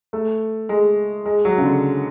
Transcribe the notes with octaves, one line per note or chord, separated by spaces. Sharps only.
A3
G#3
G#3
F#3
C#3
D3